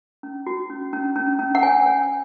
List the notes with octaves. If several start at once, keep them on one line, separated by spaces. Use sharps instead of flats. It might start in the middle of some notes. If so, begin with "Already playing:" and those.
C#4
F#4
C#4
C#4
C#4
C#4
F#5
C#5 G#5
C#5